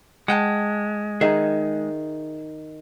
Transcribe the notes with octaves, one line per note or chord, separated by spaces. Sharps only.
G#3 F#5 G5 A5
D#3 D#4 G#4 E5